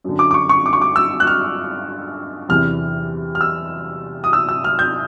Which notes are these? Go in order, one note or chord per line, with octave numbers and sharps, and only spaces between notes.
F#2 D3
D6
D6
C#6
C#6
D6
C#6
D6
E6
F#6
F6
E2 C3 E3 F6
F6
E6
D#6
E6
E6
F6
G6